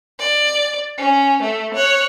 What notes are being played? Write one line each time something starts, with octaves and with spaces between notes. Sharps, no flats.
D5
C#4
A3
C#5 F#6